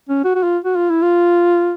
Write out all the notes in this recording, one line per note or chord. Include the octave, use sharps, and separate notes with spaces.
C#4
F#4
F#4
F4
F#4
F4
E4
F4